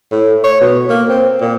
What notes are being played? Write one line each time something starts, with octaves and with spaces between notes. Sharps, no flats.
A2
C#5
B2
A#3
C4
A#2